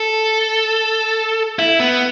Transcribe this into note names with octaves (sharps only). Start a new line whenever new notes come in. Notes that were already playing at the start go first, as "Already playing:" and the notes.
Already playing: A4
E4
B3